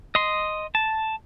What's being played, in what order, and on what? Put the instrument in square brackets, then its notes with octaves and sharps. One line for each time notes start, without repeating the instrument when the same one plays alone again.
[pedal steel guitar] D#5 C6
A5